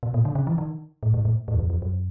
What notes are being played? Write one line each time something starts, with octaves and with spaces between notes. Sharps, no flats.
B2
A#2
D3
C#3
E3
D#3
A2
G#2
A2
G#2
E2
F2
F2
F#2